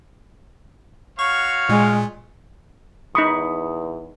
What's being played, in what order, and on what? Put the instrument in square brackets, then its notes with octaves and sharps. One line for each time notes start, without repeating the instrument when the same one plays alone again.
[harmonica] F#4 C#5 F5 [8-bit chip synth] C#6
[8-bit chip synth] A#2 [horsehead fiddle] G#3
[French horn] E2 [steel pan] D#4 B5 C#6 [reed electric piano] D#6